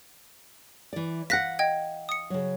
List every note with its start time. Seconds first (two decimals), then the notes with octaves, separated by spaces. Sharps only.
0.93 E3 D5
1.30 F5 F#5 F#6 A#6 B6
1.59 D#5 G5 G#6
2.09 D#6 C#7
2.30 C#3 F#3